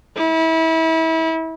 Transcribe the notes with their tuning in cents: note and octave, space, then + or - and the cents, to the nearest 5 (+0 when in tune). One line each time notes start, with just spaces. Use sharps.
E4 -30